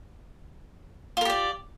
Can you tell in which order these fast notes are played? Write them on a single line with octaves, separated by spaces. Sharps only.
F4 A#4 G4 D5